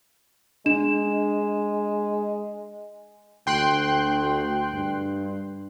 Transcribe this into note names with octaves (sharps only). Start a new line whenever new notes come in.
G#3 D4 E7
D2 G5 C6 F#6
G2